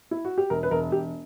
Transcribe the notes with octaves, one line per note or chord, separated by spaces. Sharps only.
E4
F#4
G4
E1 A#4
B4
E1 A#4
E1 G4